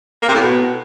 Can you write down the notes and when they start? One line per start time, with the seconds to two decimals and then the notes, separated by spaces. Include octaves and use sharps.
0.22 A#3
0.29 C3
0.35 A2
0.41 B2